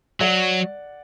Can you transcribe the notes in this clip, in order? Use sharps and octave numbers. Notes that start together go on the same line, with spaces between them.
F#3 D5 F#5